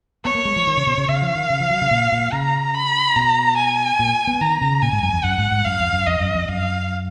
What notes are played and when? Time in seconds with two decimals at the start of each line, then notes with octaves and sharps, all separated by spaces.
0.25 B3 C#5
0.35 A#3
0.45 G#3
0.56 F3
0.67 D#3
0.77 C#3
0.87 B2
0.98 C#3
1.08 C#3 F5
1.22 F3
1.35 D#3
1.50 C#3
1.60 F3
1.70 F#3
1.81 C#3
1.91 A#2
2.12 A#2
2.32 C#3 A#5
2.75 B5
3.16 B2 A#5
3.58 G#5
3.99 A#2
4.27 B3
4.41 D#3 A#5
4.61 C#3
4.82 A#2 G#5
4.92 G#2
5.02 F#2
5.13 F2
5.24 F#2 F#5
5.38 G#2
5.51 G#2
5.65 F#2 F5
5.80 F2
5.93 F#2
6.07 F2 D#5
6.20 F#2
6.35 F2
6.48 F#2 F5